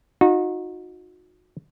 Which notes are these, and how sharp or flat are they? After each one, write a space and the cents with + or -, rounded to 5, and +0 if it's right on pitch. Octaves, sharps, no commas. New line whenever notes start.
D#4 +5 F#4 -35